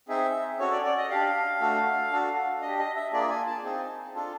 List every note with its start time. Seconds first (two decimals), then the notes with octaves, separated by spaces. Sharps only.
0.09 C4 D#4 G#4 E5
0.60 C#4 F#4 A4 C#5
0.72 D5
0.85 D5
0.98 D#5
1.10 D4 G4 F5
1.60 A3 D4 F#4 A4
2.11 D4 F#4 A4
2.62 D4 G4 D#5
2.79 D#5
2.96 E5
3.12 A#3 D4 F4 G#4 D5
3.30 G#5
3.47 A5
3.63 C4 D#4 G#4
4.14 D4 F4 A4